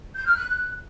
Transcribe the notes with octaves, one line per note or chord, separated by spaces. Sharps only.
G6
F6
F#6
F#6